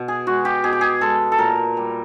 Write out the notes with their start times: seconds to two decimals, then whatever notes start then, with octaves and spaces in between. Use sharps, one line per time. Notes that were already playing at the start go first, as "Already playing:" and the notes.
Already playing: B2
0.08 G#4
0.27 G#3 F#4
0.45 G4
0.64 B2 G#4
0.73 G4
0.81 G#4
1.01 G#3 A4
1.32 A4
1.38 A#2 A#4
1.77 G3